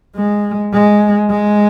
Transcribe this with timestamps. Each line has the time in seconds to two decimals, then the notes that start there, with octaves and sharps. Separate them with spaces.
0.16 G#3
0.73 G#3
1.30 G#3